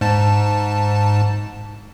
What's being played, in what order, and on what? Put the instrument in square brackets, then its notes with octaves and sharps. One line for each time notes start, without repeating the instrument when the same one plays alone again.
[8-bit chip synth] G#2 A5